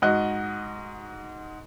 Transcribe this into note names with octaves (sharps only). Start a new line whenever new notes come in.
G#2 F#4 D#5 F#6